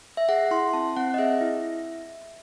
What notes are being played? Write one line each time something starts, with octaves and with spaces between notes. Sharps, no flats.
E5
G#4 F#5
E4 C6
C4 A5
C4 F#5
D#5
G#4 E5
E4